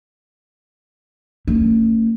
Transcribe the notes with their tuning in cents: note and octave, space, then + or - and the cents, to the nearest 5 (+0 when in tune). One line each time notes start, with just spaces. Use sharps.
A3 +40 C#4 +0